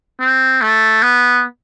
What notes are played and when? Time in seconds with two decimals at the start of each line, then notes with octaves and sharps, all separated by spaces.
0.21 C4
0.62 A3
1.03 B3